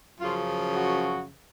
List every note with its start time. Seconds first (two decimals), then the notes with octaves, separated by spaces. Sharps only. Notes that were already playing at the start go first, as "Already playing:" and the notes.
0.20 F#2 C#3 F3 F4
0.74 F#4